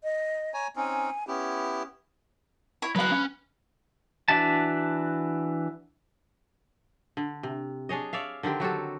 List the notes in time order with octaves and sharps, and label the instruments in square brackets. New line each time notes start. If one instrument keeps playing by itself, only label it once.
[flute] D#5
[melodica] C#5 G#5 A#5
[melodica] C4 C#4 D#4 [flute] G#5
[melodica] B3 E4 G4 [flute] C#4
[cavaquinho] E4 C#5
[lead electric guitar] F#3 F5 [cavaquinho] B4 F#5
[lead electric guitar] C#4
[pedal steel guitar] E3 D4 F#4 E5 A5
[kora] D3
C3
D4 G#4 C#5 D#5
C#5 D5 E5 F5
D3 D#3 C4 G4
F#3 F#4 G4 A4